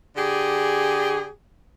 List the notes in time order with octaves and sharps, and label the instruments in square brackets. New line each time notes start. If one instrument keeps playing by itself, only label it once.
[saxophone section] D3 G4 G#4